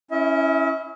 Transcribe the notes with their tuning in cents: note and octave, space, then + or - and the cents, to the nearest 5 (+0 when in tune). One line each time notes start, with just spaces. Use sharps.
C#4 +0 E4 +0 E5 -45